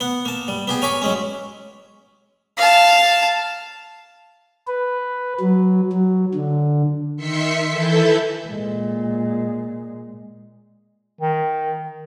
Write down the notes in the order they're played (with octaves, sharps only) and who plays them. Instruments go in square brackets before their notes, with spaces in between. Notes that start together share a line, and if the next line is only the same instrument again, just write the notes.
[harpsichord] B3 F#5
A#3 A5
G3
B3 G4 G#4
A#4 C#5 G#5 B5 D6
F#3 G#3 C#4
[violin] F5 A5
[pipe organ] B4
F#3
F#3
D3
[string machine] D#3 E5 C6 B6 C#7
E3 E4 A4 E5 G6
[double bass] A#2 G#3
[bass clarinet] D#3